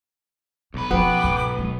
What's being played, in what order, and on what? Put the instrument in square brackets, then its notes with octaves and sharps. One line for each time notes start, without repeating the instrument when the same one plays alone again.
[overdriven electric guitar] B1 B4 [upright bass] B3
[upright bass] F3 C#4 [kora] B3 [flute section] F#4 G5 D6
[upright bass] C#2 G#2
C#2